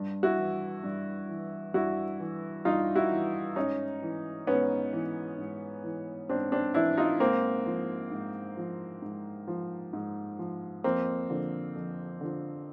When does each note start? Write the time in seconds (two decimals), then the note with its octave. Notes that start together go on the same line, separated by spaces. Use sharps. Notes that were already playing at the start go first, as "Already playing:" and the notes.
Already playing: G2
0.23 E4 F#4
0.38 E3
0.84 G2
1.29 E3
1.74 G2 E4 F#4
2.20 E3
2.65 G2 D#4 F4
2.96 E4 F#4
3.11 E3
3.56 G#2 C#4 D#4
4.02 E3
4.47 G#2 B3 C#4
4.93 E3
5.38 G#2
5.84 E3
6.29 G#2 C4 D4
6.52 C4 D4
6.74 E3 D4 E4
6.98 D#4 F4
7.20 G#2 A#3 C4
7.66 F3
8.12 G#2
8.57 F3
9.02 G#2
9.48 F3
9.93 G#2
10.39 F3
10.84 F2 A#3 C4
11.30 D3 F3
11.75 F2
12.21 D3 F3